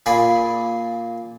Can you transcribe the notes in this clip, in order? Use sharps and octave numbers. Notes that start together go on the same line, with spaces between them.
A#2 G#4 D5 G#5 B5